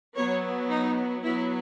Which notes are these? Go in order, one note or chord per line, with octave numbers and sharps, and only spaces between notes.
F#3 B3 C#5
D#4
F#3 B3 E4